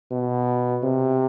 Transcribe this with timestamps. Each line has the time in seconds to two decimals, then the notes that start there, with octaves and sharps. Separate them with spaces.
0.11 B2
0.84 C3